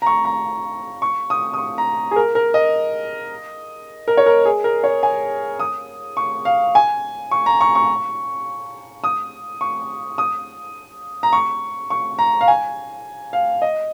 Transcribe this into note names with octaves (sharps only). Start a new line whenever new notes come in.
A#5
C#6
A#5
C#6
D#6
D#6
C#6
A#5
G#4
A#4
A#4
D#5
A#4
C#5
A#4
G#4
A#4
C#5
G#5
D#6
C#6
F5
G#5
C#6
A#5
C#6
C#6
D#6
C#6
D#6
A#5
C#6
C#6
A#5
F5
G#5
F5
D#5